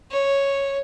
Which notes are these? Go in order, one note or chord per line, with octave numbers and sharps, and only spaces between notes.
C#5